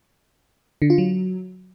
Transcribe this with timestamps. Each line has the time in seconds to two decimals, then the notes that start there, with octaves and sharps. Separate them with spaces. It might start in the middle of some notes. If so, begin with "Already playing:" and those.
0.82 D3
0.90 F4
0.98 F#3